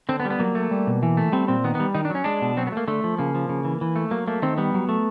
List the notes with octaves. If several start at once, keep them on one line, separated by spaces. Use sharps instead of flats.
D3 C4
B3
G3
B3
F#3 A#3
A3
G3
B2
E3
A3
G3 C4
A#2 C4
D#3 B3
G3 B3
D#3 D#4
D4
F#3 C#4
G#3 D4
B2
F#3 C4
B3
A3 A#3
D3 A3
F3
C#3 A#3
F3
C#3
E3
E3
A3
F#3 A#3
A3 A#3
D#3 C4
G3 B3
F#3
A3